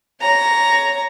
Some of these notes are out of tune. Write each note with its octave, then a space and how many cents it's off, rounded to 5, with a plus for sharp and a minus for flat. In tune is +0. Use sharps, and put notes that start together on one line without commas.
C#5 +15 A#5 +0